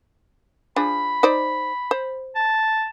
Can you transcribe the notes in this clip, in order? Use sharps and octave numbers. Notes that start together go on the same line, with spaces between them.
F3 D4 G#4 B5
D#4 C5 D5
C5
A5